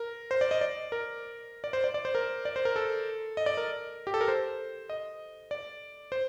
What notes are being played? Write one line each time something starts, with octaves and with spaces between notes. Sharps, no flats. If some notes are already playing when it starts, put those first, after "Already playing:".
Already playing: A#4
C5
D5
D#5
D5
A#4
D5
C5
D5
D5
C5
A#4
D5
C5
A#4
A4
D#5
D5
A#4
G4
A4
A#4
C5
D#5
D5
C5